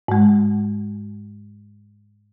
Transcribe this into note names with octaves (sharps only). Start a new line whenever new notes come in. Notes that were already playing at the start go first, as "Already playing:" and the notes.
G#2 G#3